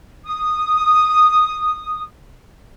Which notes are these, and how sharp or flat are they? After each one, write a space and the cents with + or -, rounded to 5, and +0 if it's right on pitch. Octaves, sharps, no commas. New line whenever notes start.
D#6 -10